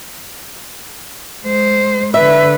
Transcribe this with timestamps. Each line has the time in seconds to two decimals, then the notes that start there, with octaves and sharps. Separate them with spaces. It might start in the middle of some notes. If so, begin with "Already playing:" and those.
1.45 G#3 C5
2.14 D3 B4 E5